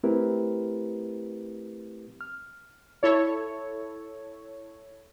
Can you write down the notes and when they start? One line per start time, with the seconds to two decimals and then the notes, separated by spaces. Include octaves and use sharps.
0.03 A3 C4 E4 G4 A#4 B4
2.21 F6
3.03 E4 A4 C#5